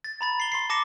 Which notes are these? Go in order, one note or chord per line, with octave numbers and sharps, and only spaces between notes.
A6
A#5 B5 A6
C7 G7
C6 C7
A5 D6 A#6 C#7 E7